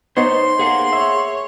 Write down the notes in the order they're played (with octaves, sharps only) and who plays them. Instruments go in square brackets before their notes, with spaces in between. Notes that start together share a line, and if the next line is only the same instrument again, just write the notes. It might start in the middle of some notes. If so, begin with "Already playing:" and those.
[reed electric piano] B3 D#4 C#5 [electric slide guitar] C5 D#5 [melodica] C6
[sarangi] A#3 [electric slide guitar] G#4 F#5
[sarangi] C#5 [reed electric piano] E5